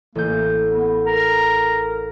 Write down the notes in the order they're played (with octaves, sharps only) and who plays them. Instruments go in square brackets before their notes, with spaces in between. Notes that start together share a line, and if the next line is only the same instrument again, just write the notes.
[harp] A1 G6 [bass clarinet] A#3
[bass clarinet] B3
[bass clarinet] A#4 [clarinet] A#5